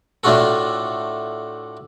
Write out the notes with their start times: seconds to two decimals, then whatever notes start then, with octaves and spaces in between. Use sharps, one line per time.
0.24 A2 A3 D4 F4 F#4 A4